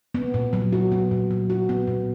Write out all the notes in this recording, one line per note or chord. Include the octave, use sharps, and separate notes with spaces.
B3
A#2
F#3
F#4
B3
A#2
F#3
F#4
B3
A#2